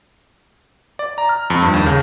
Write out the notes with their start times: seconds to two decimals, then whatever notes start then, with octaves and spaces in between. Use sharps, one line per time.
0.99 D5
1.18 A#5
1.29 F6
1.50 F2
1.62 G2
1.74 D#2
1.86 C#3